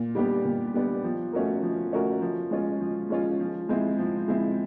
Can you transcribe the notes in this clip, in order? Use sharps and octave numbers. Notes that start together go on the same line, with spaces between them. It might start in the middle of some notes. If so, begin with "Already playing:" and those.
Already playing: A#2
G3 B3 D4 G4
A#2
G3 B3 D4 G4
F3
A3 C#4 F#4 A#4
F3
A3 C#4 F#4 A#4
F3
G#3 C#4 F4
F3
G#3 C#4 F4
F3
G#3 C4 E4
F3
G#3 C4 E4